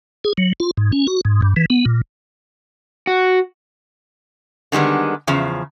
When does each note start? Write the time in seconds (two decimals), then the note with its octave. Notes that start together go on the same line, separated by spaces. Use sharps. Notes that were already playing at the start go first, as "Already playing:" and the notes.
0.24 G#4
0.38 F#3
0.60 F4
0.77 G#2
0.92 C#4
1.07 F#4
1.25 G#2
1.42 G2
1.56 E3
1.70 B3
1.85 A#2
3.07 F#4
4.72 D3 D#3 G3 G#3 B3
5.27 E2 C#3 F3